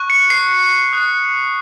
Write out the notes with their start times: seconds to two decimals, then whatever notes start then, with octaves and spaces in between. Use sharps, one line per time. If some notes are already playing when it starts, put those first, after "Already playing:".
Already playing: C#6 F#6
0.10 C#7
0.30 C7
0.92 D#6 F#6